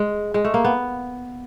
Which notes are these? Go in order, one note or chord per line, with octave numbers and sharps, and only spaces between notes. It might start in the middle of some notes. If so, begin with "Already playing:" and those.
Already playing: G#3
G#3
A3
A#3
B3